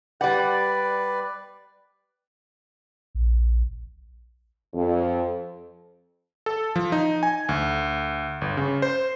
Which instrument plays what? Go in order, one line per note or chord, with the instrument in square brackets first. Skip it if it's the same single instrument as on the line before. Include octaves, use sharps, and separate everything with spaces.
[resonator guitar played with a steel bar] G3 F#5 [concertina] B4 D5
[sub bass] A#1
[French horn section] F2
[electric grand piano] A4
F3
D#4
G#5
D2
G1
C#3
C5